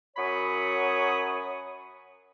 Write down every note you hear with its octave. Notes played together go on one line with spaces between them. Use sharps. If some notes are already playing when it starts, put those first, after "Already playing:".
F#2 F#3 C#5 B5 C#6 D#6